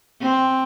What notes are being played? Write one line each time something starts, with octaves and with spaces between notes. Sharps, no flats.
C4